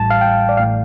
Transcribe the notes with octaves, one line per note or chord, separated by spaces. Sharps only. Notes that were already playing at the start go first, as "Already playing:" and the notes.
Already playing: A1 A2 G3 A5
F5
G5
D5
A1 A2 A3 F5